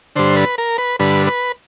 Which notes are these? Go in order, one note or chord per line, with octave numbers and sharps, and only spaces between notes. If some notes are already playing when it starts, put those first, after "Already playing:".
G2 D3 C5
B4
A#4
B4
G2 D3 B4
B4